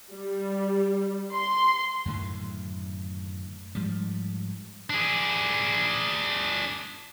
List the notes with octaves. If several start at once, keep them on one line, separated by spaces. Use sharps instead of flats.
G3
C6
F#2 A2 D3 D#3
G#2 F3 G3
D4 G#4